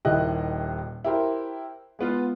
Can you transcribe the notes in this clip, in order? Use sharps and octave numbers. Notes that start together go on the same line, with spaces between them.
D#1 D#3 E4 G4 D#5 F#6
E4 G4 A#4 C5
G#3 B3 F4